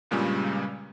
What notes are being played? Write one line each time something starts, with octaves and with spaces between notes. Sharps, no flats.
C#2 G2 A#2 C#3 G3 G#3